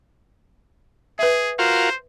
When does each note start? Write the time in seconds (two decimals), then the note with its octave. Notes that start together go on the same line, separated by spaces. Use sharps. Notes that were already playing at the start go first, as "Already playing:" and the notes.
1.19 G#4 B4 E5
1.59 F4 F#4 A#4 C5